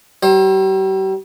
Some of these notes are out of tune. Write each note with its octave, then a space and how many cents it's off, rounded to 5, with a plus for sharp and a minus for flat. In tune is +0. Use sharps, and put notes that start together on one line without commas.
G3 -40 C5 +40